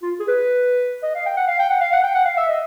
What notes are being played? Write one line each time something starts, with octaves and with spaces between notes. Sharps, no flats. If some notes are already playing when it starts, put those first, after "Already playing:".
F4
G#4
B4
D#5
F5
G5
F#5
F5
G5
F#5
F5
F#5
G5
F#5
F5
E5
D#5